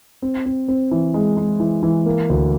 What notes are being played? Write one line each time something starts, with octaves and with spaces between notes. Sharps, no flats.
C4
C4
C4
E3
G#3
G#3
E3
E3
A#3
D2